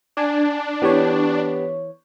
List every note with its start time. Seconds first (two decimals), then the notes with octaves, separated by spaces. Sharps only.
0.17 D4 D5 G#5 A5
0.82 E3 B3 G4 C#5